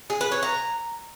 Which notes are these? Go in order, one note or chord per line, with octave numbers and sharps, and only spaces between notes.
G#4
B4
C#5
A#5